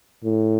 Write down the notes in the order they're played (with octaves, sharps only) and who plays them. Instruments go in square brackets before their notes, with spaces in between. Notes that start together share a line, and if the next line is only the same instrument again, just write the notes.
[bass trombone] A2